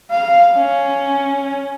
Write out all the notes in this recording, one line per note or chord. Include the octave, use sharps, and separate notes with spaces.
F5
C#4